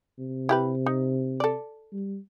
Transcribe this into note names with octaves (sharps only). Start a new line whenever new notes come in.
C3
E4 G4 B4
D#4
A4 D5
G3